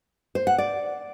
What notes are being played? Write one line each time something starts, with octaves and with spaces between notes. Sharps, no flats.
C5
F#5
D5